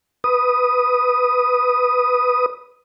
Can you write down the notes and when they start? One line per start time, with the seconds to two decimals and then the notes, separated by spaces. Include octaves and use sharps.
0.24 B4 D#6